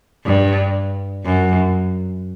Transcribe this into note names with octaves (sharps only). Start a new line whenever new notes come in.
G2
F#2